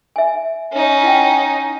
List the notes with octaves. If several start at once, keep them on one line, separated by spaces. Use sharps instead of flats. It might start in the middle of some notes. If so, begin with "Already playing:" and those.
E5 G#5
C#4 D#4
E4 F#5 G5